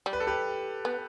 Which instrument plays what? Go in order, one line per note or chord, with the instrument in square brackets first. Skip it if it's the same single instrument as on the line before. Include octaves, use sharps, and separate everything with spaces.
[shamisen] G3
[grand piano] B4
A4
G4 B4
[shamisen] B3